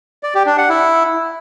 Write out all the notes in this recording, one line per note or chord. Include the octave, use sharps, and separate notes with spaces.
D5
G4
D4
F#5
E4